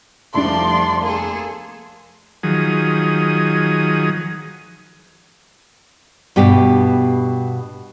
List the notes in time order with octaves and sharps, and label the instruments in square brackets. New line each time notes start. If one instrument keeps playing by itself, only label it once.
[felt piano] F1 G3 D4 [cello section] F3 D5 [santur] A3 [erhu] C6
[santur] A#3 [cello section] G#4 A4
[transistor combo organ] D#3 F3 F#3 G#4 D#6
[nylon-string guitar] G2 B2 G4